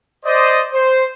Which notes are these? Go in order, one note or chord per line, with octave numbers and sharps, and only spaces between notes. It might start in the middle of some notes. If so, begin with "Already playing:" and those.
C5 D5 D#5
C5